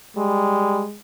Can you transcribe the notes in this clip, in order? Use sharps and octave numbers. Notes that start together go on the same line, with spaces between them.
G3 G#3